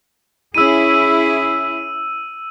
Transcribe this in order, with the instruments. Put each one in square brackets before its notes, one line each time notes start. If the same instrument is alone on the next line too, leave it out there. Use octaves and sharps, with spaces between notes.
[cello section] C#4 E4 G#4 [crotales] E6 D#7